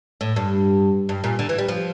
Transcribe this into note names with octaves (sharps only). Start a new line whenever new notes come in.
A2
G2
G2
A#2
D3
E3
G3
F3